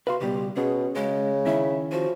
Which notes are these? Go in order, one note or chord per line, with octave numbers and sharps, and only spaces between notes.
F#4 B4 F5 C6
C#2 B2 G3 G4
B2 C#4 G#4
C#3 G#3
D#3 C#4 E4 E5
F3 F#4